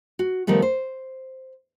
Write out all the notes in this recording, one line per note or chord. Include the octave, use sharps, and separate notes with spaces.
F#4
D#3 F3 G3 A3 B3
C5